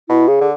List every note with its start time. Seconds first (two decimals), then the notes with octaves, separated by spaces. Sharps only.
0.09 B2 E4
0.28 C#3 G#4
0.41 D3